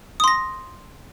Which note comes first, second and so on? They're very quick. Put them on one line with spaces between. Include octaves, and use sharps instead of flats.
D#6 C6 A#6